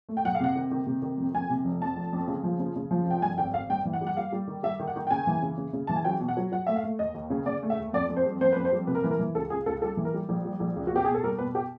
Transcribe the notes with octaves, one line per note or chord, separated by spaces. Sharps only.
A3
G5
B1 F#5
F5
C3 F#5
D#3
D#3
C3
D#3
F2
F2 G#5
C3
F1
F2 A5
F1
F2
C#3
F3
C#3
C#3
F3
F1 G5
G2 G#5
G#1 G5
G#1 F5
G2 G5
E3
F#5
G3
F#5
G3 F5
G3
D#3
G3 E5
D#3
F#5
D#3
G5
C#3 G#5
E3
C#3
C#3
C#3
E3 A5
G#5
F#3 G5
B2
F#5
F#3
F#3 F#5
A3 E5
F5
A3
D#2 D#5
D#2
C#3
C#3 D5
A3
E5
D#2
F2 D5
F2
C5
G3
F2 C5
F2 B4
C5
G3
C3 B4
A#4
E3 B4
A#4
E3
C#2 A4
C#2 G#4
C#2 A4
G3 A4
E3
A#4
G3
A#1
G3
A#1
C#2
F#4
B2 G4
B2 G#4
A4
G3 A#4
B2 B4
G4